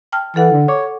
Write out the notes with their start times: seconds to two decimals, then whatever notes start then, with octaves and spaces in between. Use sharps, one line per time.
0.12 G5 A5 F6
0.36 E3 A4 F#5
0.52 D3
0.68 C#5 D6